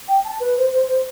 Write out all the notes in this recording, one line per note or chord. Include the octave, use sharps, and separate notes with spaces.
G5
A5
B4
C5
C5
C5